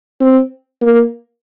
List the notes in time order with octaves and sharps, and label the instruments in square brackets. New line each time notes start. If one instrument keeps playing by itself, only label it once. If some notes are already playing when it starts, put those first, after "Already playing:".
[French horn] C4
A#3